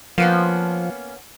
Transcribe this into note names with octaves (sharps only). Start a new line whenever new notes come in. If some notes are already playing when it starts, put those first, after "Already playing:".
F3 A#3 B3 C#4